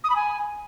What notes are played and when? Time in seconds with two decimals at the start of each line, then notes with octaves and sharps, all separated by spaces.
0.03 D#6
0.09 B5
0.15 G#5